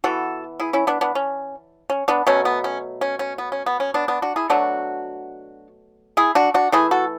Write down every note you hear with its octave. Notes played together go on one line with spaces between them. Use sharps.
E3 B3 F#4 A4
E4 G#4
C#4 E4
B3 D4
B3 D4
C#4
C#4
B3 D4
B2 F#3 A3 C#4
B3
C#4
C#4
C#4
B3
C#4
B3
C#4
B3 D4
B3 D4
D4 F#4
E4 G#4
B2 F#3 A3 D4 F#4
E4 G#4
D4 F#4
D4 F#4
E3 A3 E4 G#4
F#4 A4